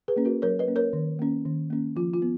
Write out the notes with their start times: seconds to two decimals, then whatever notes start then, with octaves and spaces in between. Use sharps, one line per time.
0.08 G#4 B4
0.16 A#3 C#4
0.25 F#4 A#4
0.42 F#3 A#4 C#5
0.59 B4 D#5
0.68 A#3 C#4
0.76 A#4 C#5
0.93 D#3
1.19 A#3 C#4
1.45 D#3
1.70 A#3 C#4
1.96 F3 F4
2.14 F4
2.22 B3